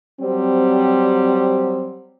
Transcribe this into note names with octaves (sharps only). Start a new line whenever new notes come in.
F#3 G3 C4